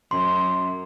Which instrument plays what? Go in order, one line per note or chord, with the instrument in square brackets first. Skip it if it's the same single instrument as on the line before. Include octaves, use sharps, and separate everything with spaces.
[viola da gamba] F#2 [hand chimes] C6